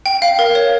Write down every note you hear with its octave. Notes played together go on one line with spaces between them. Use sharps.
G5
F5
A#4
C#5